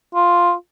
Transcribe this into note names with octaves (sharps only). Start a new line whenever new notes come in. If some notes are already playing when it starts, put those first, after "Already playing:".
F4